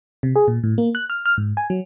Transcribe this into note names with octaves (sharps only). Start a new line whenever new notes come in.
C3
G#4
A#2
A2
A#3
F#6
F6
F6
G#2
G#5
F#3